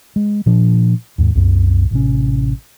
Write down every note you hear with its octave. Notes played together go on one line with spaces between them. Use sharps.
G#3
A#2 F3 D4
D#2 G#2
C2 F#2
A1 C3 C#4